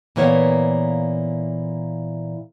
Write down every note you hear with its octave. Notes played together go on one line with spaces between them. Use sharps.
A#2 E3 A#3 B3 C#5